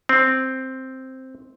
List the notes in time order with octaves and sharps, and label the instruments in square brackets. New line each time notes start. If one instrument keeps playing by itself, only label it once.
[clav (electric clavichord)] C4